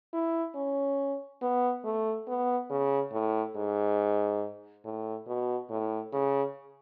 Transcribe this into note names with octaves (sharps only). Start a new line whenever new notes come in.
E4
C#4
B3
A3
B3
C#3
A2
G#2
A2
B2
A2
C#3